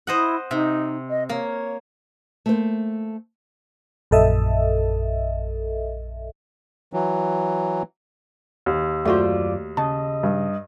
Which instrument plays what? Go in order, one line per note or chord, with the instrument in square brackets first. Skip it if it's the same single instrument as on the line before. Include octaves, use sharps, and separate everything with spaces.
[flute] E4 [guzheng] C5 D#5 F#5
[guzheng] C3 [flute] D#4
[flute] D#5
[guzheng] A#3 [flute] C#5
[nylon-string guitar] A3 A#3 C5
[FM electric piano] A#1 F#2 A4 D#5 E5
[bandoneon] E3 F#3
[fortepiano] D#2
[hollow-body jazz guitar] F#2 F4 C5 [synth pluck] A3 F#4 [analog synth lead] D5
[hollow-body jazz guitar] C#3 [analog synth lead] D#5 [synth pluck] A5
[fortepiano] G2